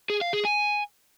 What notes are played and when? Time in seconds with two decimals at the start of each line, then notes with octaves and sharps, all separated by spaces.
0.10 G#4
0.21 F5
0.33 G#4
0.45 G#5